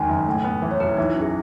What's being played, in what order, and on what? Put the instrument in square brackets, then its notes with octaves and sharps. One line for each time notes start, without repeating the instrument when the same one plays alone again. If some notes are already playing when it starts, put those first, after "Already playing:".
Already playing: [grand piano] E2 D#3 G#3 [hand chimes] G#5
[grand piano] F#1
A2
B3
[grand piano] E3 [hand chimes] B4
[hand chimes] C#5
[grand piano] B1 [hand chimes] B4
[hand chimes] E4
[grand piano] E3 [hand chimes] D#4
[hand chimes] E4
[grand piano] F#2
[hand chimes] G#4